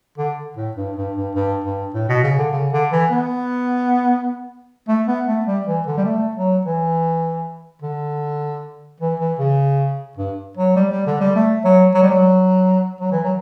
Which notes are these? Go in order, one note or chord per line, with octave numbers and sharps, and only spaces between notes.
D3
A2
G2
G2
G2
G2
G2
A2
B2
C#3
D3
C#3
D3
E3
B3
A3
B3
A3
G3
E3
D3
G3
A3
F#3
E3
D3
E3
E3
C#3
G2
F#3
G3
G3
D3
G3
A3
F#3
F#3
G3
F#3
F#3
E3
F#3